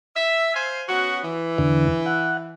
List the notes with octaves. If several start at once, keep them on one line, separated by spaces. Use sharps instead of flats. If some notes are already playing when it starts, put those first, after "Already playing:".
E5
C5 F5 G#5
B3 C#4 F#4
E3
E2 D3
F#5